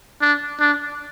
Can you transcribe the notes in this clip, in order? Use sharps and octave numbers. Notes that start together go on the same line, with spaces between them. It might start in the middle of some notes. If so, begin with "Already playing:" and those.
D4
D4